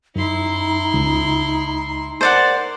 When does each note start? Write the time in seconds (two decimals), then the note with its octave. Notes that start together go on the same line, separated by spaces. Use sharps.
0.16 F#2 D#4 E4 C6
0.94 C#2
2.21 A#4 C5 D5 F#5